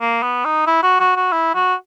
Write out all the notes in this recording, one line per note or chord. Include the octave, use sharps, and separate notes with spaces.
A#3
B3
D#4
E4
F#4
F#4
F#4
E4
F#4